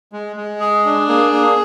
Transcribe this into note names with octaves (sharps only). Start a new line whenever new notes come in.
G#3
G#3
G#4
D4
A#3 G#4
A#3